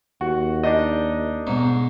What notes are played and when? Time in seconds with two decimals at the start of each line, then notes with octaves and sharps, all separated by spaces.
0.21 D#2 F#4
0.64 D4 D#4 D#5
1.47 B1 G#2